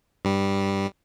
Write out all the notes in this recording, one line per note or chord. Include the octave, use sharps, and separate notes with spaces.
G2 G3